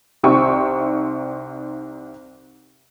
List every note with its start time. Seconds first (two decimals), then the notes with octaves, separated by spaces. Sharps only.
0.23 C2 C3 C4 D#4 G5 C#6